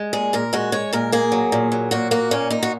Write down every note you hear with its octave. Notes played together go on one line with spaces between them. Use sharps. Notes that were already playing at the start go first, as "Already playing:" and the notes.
Already playing: G#3
A#2 G#4
A#2 A#4
G#3 F#4
G#3 C#5
A#2 A#4
A#3 G#4
F#3
A#2
F#3
A#2 F#4
A#3 F#4
A#2 C#4
A#2 D#4
F#4